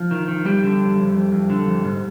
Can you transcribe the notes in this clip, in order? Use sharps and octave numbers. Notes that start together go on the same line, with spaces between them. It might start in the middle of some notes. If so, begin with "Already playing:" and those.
Already playing: F3 F4
D#3
D#3
F2 G3 G4
D3
F2
F2
F2
F2
D3
F2
G#2